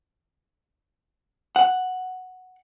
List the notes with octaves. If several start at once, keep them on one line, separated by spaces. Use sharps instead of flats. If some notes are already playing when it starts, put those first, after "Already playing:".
F#5